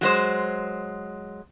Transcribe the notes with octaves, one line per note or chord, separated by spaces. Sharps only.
F#3 G#3 C5